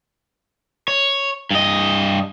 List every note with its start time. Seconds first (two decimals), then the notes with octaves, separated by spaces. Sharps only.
0.88 C#5
1.51 G2 D#5